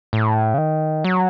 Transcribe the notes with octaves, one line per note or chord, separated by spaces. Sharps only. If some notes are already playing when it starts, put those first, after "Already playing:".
A2
C#3
D#3
F#3